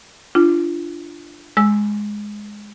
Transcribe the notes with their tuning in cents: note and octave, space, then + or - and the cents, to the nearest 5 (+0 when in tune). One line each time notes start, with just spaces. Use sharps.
D4 +0 F4 -25
G#3 +0 E6 -5